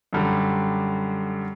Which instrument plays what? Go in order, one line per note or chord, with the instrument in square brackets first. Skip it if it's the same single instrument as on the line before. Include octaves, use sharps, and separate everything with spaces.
[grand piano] F#2 D3 G3